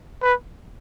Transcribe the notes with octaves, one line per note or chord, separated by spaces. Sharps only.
B4